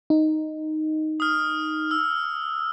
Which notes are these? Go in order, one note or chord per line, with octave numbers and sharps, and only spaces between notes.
D#4
D#6 F6
E6